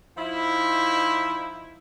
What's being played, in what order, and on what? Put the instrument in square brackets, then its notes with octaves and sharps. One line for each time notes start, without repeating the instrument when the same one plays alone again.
[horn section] F3 D#4 E4